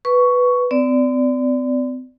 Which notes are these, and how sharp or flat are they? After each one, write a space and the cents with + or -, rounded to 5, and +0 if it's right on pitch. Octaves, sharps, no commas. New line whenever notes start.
B4 +0 C#6 +10
C4 -40 D5 -10